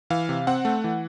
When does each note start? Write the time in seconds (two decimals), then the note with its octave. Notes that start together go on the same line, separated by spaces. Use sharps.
0.10 E3 F5
0.29 C3
0.47 C4 F#5
0.65 A3
0.84 E3